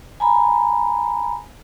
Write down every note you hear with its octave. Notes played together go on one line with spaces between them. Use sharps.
G#5 A#5 B5